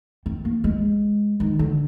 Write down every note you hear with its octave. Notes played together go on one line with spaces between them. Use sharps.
C4
A#3
G#3
D#3
D3